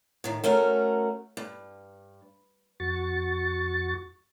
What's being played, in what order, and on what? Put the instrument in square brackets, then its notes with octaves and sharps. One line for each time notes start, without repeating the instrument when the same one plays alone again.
[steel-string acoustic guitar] A2 D#3
A3 C#4 F#4 A#4
G2
[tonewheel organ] F2 F#4 C#6 A6